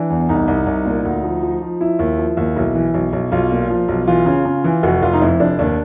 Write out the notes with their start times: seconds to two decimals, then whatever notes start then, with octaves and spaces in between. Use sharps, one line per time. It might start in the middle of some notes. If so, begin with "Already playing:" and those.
Already playing: E3 D4
0.10 E2
0.29 C2 D#4
0.48 C2
0.66 C2
0.86 A#2
1.05 D2
1.23 F3
1.43 F3
1.62 F3
1.80 F3 E4
1.99 D#2
2.18 F3
2.37 D#2
2.56 B1 E4
2.75 E3
2.94 B1
3.13 B1
3.32 B1 F4
3.51 A#2
3.70 F3
3.88 B1
4.08 E3 F4
4.26 C#3
4.45 C#3
4.64 E3
4.83 F1 F#4
5.02 F1 F4
5.13 D#4
5.21 F2 E4
5.40 F1 D4
5.59 D#2 D4